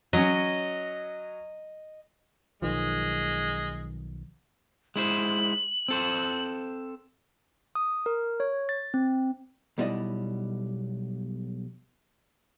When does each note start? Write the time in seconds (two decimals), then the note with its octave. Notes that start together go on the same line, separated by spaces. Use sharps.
0.13 F#3 C#4 D#5
2.62 B1 D#3 F3 G#3
4.96 G#3 E4 C5 F#7
5.88 C4 A4 C5
7.75 D#6
8.06 A#4
8.40 C#5
8.69 A6
8.94 C4
9.78 B1 B2 G3 E4 D5 D#5